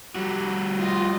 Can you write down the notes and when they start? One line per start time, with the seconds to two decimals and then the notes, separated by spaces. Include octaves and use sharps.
0.15 G3 F#4
0.76 F4 D#5